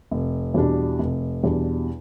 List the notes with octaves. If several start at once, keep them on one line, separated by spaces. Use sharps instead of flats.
F1
E2 B2 G3 D4
F1
E2 B2 G3 D4